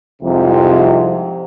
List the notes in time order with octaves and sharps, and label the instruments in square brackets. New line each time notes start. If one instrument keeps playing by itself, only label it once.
[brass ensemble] C2 F2 G#2 C3